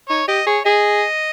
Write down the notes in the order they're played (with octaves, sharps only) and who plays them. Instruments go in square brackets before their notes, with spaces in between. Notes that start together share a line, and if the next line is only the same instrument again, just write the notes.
[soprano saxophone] D#4 [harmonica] C#5
[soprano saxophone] G4 [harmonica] D#5
[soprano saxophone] G#4 [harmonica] C#5
[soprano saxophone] G#4 [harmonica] D#5